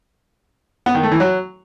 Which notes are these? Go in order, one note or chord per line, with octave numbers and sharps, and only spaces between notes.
B3
D#3
A3
E3
F#3